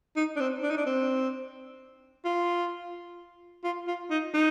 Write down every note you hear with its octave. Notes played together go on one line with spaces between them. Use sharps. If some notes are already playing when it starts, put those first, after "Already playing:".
D#4
D4
C4
D4
D#4
D4
C4
F4
F4
F4
D#4
D#4